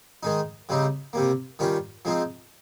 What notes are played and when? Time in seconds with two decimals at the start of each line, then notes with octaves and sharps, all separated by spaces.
0.23 D#3 G#3 D#4
0.69 C#3 G3 C4 D#4
1.13 C3 G3 A#3
1.59 D#3 G3 C#4 F4
2.05 F3 G#3 C4 D#4